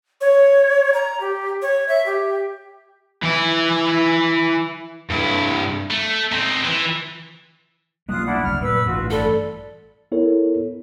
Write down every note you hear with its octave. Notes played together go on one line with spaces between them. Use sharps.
C#5
A#5
G4
C#5
E5
G4
E3 E4
G2 E4
A3
C4 D#4
E3
B1 G3 A#3 F4 D#6 F#6
D4 E4 F#5
F#1 D2 F6
A#2 B4 E6
A1 G2 F4 F#4
A4 D5 A5 B5
B3 E4 A4 A#4 C#5